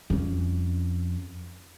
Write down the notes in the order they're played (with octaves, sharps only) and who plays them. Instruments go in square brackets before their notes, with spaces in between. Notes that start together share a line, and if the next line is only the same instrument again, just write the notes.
[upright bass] F2 C#4